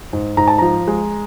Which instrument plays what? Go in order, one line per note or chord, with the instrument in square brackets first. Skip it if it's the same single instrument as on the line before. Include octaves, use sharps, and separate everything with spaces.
[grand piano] G#2
G#2 A#5
A5
F3 A#5
G#3